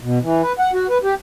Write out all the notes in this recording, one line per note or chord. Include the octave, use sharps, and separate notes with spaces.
B2
E3
B4
F#5
F#4
B4
G4